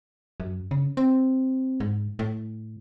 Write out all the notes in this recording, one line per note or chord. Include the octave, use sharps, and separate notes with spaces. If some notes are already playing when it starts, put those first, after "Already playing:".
F#2
C#3
C4
G#2
A2